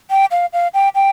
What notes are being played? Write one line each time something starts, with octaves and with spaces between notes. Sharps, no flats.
G5
F5
F5
G5
G5